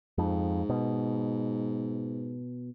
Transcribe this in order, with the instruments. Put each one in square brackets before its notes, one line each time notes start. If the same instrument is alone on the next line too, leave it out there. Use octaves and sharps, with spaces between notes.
[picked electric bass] F2 [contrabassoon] G#2
[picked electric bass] B2